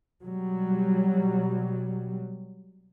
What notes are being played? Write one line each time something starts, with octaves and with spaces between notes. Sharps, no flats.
B2 F#3 G3